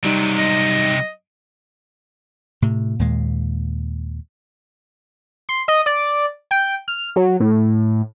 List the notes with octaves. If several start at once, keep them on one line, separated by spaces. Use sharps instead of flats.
C3 F#3 G3 D#4
D#5
A2 C3
D#2 A#2 G#3
C6
D#5
D5
G5
F6
F#3
A2